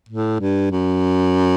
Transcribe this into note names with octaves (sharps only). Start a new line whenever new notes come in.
A2
G2
F#2